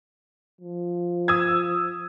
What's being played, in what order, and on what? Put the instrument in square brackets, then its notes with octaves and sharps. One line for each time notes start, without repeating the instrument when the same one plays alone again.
[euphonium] F3
[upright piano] D#6 E6 G#6